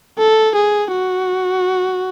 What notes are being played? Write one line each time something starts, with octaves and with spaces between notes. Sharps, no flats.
A4
G#4
F#4